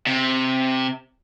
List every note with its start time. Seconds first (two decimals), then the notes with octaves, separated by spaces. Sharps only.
0.07 C3